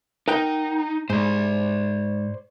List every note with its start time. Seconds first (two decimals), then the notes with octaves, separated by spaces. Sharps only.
0.28 D#4 A#4 F#5 G5
1.10 G#2 C5 D5